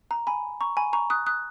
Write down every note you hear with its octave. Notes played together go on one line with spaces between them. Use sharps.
A#5
G#5 B5
A#5 C#6
G#5 B5
A#5 C#6
D#6 F#6
D#6 F#6